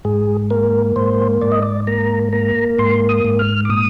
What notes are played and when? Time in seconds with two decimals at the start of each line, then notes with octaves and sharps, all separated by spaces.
0.05 G#2 G#4
0.50 A#3 A#4
0.96 G#2 C5
1.42 G#2 D5
1.52 D#5
1.63 D5
1.87 A#3 A#5
2.33 A#3 A#5
2.79 G#2 C6
3.09 D#6
3.25 G#2
3.39 F6
3.65 D6
3.69 A#2 D#6